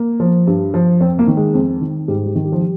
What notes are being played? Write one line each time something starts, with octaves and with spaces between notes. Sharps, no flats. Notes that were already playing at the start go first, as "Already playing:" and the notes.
Already playing: A#3
F3
G2
F3
F2 C4
A#3
D#3
G#3
F2
D#3
G#2 G3
G3
D#3
G3
F3
G3